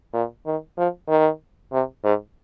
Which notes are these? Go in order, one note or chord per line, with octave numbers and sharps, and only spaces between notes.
A#2
D#3
F3
D#3
C3
G#2